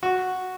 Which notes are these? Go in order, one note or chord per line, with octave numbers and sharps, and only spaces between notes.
F#4